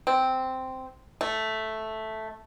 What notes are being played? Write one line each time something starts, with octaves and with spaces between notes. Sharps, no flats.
C4
A3